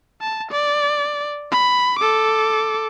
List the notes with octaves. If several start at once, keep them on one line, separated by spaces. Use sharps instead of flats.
A5
D5
B5
A4 D6